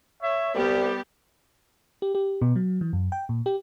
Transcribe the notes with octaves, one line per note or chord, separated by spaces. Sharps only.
C#5 E5
C2 G3 B3 G4
G4
G4
B2
F#3
E3
F#2
G5
A#2
G4